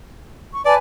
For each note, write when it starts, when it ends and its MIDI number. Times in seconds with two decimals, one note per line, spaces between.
0.53 0.64 85
0.65 0.77 71
0.65 0.74 74
0.65 0.77 80
0.65 0.77 81